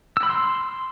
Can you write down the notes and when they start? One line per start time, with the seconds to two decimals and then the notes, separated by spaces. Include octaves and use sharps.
0.17 E6
0.23 B5
0.29 C6